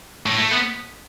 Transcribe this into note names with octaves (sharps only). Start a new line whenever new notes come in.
A2
A3
B3